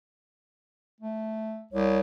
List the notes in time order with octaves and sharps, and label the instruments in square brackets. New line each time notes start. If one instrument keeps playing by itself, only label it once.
[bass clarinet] A3
[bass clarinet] C2 [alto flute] C#5